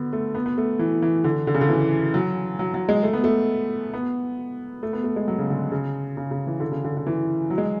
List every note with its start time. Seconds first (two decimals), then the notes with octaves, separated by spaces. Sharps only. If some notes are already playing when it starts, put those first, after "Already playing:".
Already playing: D3 B3
0.13 A3
0.35 B3
0.46 B3
0.58 A3
0.79 E3
1.02 E3
1.24 D3
1.47 D3
1.54 C#3
1.61 D3
1.69 E3
2.14 F#3
2.59 F#3
2.74 F#3
2.89 G#3
3.03 A3
3.13 B3
3.24 A3
3.94 B3
4.83 A3
4.93 B3
5.04 A3
5.16 G#3
5.28 F#3
5.39 C#3
5.50 D3
5.72 C#3
6.17 C#3
6.31 C#3
6.47 E3
6.60 D3
6.72 C#3
6.84 D3
6.97 D3
7.07 E3
7.50 F#3
7.58 G#3